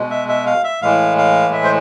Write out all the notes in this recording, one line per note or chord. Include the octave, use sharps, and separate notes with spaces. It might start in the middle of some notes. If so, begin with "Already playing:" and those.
Already playing: B2 G#3
E5
E5
F5
E5
A2 E3 G#3 F5
F5
E5
C5